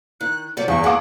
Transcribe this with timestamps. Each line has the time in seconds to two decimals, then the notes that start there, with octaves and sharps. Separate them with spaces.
0.21 D#3 F#6
0.57 C3 F#3 G3 D5
0.68 E2 G2 C#6
0.84 G#3 A#3 G#4 F#5 D6